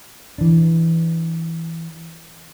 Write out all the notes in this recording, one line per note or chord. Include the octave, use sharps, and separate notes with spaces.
E3 D4